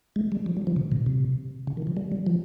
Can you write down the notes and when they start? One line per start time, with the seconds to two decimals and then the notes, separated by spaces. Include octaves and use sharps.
0.16 G#3
0.32 G3
0.46 F3
0.57 G3
0.67 F3
0.76 C#3
0.92 A#2
1.06 C3
1.67 C#3
1.77 D#3
1.87 F3
1.97 G3
2.12 G3
2.27 F3